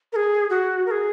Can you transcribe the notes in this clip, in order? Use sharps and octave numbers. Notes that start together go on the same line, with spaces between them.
A#4
G#4
F#4
A#4
G#4